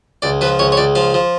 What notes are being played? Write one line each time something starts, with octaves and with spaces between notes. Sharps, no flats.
C#2 D5
F3 B4
C#2 C#5
C#5
C#2 D5
F3 F5
F3